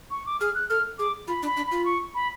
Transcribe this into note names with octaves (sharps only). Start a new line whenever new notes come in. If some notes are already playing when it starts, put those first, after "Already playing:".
C#6
D6
G#4 F6
F#6
A4 F6
G#4 D6
F4 B5
D4
B5
D4
F4 B5
C#6
B5